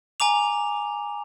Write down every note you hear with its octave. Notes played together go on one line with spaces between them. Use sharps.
G#5 A#5 D6 F7